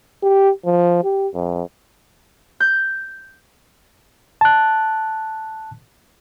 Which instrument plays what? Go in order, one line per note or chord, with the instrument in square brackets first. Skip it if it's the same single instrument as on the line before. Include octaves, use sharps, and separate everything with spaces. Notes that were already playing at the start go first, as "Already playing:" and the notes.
[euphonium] G4
F3
G4
F2
[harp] G6
[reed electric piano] A5 F#6